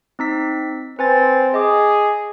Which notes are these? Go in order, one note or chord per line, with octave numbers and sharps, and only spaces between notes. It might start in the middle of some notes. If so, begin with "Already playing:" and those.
C4 D#4 B6
C4 B4 G#5 A6
G#4 D#5 D6